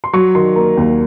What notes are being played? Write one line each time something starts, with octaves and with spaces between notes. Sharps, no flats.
C6
F#3 C#6
D#3 C6
A#3 A#5
D#2